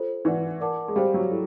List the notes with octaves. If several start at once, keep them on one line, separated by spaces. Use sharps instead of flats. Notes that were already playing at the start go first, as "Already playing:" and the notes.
Already playing: F4 A4 C5
E3 B4 D5 F#5
A#4 D5 F#5 A5 D6
G#3
G3 G4 C5 F5
F#3
E4 A4